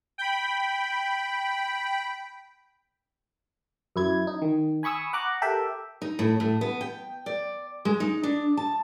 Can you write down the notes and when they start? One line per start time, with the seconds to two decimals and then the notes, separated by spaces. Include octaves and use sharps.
0.18 G5 B5
3.96 F#2 E4 G#6
4.27 D#4
4.42 D#3
4.83 G#5 B5 C#6 D#6 E6
5.13 F#5 A#5 D6 F#6
5.42 G4 A4 A#4 E5 G5
6.02 D#4
6.19 A2
6.40 A2
6.61 B3
6.81 G5
7.26 D5
7.85 G#3
8.00 D#4
8.23 D4
8.57 A5